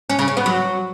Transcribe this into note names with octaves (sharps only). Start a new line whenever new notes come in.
C#4
C#3
C#4
B3
F#3